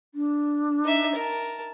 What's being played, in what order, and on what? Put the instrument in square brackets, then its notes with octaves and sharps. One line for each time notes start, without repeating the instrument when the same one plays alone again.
[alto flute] D4
[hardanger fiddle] D#4 E5
A#4 A5